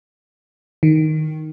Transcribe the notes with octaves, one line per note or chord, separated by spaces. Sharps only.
D#3